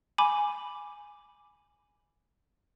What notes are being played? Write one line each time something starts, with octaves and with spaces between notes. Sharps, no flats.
G#5 B5 D6